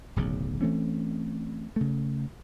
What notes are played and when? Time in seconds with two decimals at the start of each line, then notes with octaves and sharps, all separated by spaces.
0.16 D1 B1 C#3
0.62 E3 A3 C4 C#4
1.76 C#3 A3